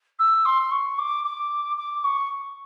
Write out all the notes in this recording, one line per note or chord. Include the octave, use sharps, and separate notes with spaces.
E6
C6
C#6
D6
D6
D6
C#6